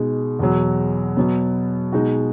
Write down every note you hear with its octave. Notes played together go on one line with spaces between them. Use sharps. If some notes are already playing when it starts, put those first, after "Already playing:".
Already playing: B2 G#3 D#4
E2 B2 F#3
B2 F#3 B3
B2 G#3 D#4 F#4